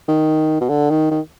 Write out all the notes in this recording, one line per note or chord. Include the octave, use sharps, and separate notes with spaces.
D#3
B2
D3
D#3
D#3